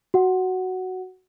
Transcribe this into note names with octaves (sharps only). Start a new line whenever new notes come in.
F#4 F#5